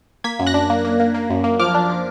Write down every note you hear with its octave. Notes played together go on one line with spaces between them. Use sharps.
A#3 G#6 B6
F#2
F#6 A#6
D4
A#3
A#3
A#3
A#3
F#2
A#3
F3 D6 F6
D4
F3